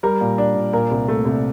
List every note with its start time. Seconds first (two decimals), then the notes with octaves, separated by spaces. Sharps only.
0.03 G3 A#4
0.21 A#2
0.38 D4
0.55 A#2
0.73 A#2 A#4
0.91 C2
1.08 A3
1.25 C2